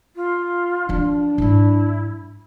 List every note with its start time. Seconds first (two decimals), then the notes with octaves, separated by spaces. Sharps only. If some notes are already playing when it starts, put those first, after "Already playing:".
0.16 F4
0.89 F3 D4 E4
1.38 G#2 F#3 E4